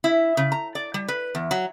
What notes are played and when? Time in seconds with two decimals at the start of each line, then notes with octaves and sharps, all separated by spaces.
0.04 E4
0.37 C#3
0.52 A#5
0.75 D5
0.94 G3
1.08 B4
1.35 E2
1.51 F#3